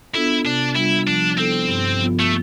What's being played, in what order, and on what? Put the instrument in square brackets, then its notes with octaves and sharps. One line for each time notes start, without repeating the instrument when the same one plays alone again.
[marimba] B3 D4 F4 A4 [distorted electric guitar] E4
[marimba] C3 [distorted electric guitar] D4
[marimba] G3 D4 F4 [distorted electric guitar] E4
[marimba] F3 [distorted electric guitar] D4
[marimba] B3 E4 A4 [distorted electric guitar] C4
[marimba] G2
F3 B3 F4
[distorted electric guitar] A3